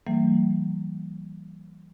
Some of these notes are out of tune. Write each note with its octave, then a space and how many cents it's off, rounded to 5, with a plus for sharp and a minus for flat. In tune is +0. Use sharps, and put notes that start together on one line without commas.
E3 +0 G3 -45 A#3 -35